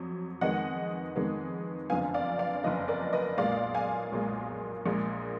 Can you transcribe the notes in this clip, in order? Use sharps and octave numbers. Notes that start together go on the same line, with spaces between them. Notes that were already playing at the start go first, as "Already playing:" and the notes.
Already playing: F2 F#3
F2 D#3 G#3 B3 D#5 F#5
F2 D#3 G#3 B3
F#1 F2 D3 F3 B3 F5 G#5
D5 F5
D5 F5
D5
F#1 F2 D3 F3 B3 B4 D#5
A#4 D5
B4 D#5
B1 A#2 G#3 D5 F5
F5 G#5
B1 A#2 G#3
A#1 A#2 G#3